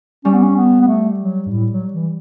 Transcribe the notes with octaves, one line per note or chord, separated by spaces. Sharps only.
G3 C#4
B3
C#4
B3
B3
A3
F#3
G2
A2
F#3
E3